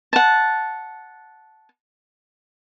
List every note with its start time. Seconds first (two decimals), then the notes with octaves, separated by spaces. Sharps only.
0.13 F#5 A5